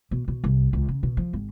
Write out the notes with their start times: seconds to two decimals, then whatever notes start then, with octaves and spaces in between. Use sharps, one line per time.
0.11 B2
0.28 B2
0.44 C2
0.73 C#2
0.89 C#3
1.03 B2
1.17 F3
1.33 G#1